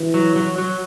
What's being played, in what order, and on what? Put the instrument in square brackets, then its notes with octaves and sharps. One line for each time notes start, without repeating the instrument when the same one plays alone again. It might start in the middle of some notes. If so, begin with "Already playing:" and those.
Already playing: [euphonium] E3
[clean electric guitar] F#3
F#3
F#3